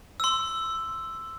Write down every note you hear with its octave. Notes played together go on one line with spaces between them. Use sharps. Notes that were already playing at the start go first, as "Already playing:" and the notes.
C6 E6